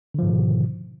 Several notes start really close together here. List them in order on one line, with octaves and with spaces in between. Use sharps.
D3 F3 G#2 D#3 B2